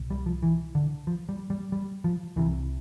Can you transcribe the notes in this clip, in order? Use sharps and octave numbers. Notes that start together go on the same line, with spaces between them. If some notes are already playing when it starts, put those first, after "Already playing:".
Already playing: C2 B2
G3
F3
E3
D3
F3
G3
G3
G3
F3
C2 C3 E3